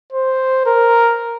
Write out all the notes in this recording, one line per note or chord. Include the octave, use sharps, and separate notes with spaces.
C5
A#4